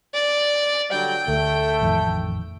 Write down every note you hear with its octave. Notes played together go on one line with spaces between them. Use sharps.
D5
D3 F#3 G3 G5
D2 A3
A1 F2 D#3